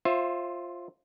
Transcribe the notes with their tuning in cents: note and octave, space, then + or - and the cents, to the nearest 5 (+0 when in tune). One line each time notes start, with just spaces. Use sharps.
F4 +0 C5 +30 E5 +0